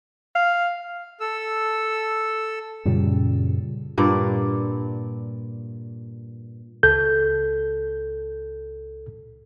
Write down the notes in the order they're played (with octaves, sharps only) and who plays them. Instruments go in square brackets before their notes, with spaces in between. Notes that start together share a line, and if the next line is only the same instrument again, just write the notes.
[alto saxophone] F5
[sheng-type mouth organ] A4 E6
[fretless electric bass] F#2 A#2 C#3 G3
[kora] G2 A#2 D5
[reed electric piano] C#2 A4 G6